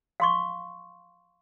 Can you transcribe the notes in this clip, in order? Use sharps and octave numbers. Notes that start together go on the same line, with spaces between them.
F5 C6 C#6